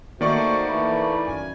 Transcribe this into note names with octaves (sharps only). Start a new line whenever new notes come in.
D#3 A3 A#3 F#4 C5 D5 C#6
E3 A3 A#3 B5
F#2 G#5